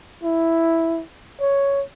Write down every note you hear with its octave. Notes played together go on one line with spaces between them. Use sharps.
E4
C#5